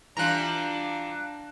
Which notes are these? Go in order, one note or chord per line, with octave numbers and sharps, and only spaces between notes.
E3 G3 D4 F4 A#5 F#6